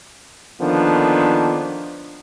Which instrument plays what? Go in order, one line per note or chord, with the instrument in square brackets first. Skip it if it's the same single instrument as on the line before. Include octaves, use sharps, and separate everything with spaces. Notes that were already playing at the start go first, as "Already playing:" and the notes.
[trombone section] D3 D#3 F3 A#3 B3 D4